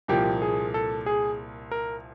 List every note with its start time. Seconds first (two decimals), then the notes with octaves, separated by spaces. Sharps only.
0.08 C2 A#2 F3 A#3 G4
0.42 G#4
0.74 A4
1.06 G#4
1.71 A#4